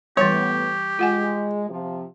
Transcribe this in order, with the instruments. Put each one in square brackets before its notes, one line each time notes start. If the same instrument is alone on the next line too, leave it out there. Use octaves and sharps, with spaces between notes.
[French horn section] A2 B3 [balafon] E3 G3 [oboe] G4 [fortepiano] C#5
[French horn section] G#3 [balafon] F4 F#5 G#5
[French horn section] C3 F3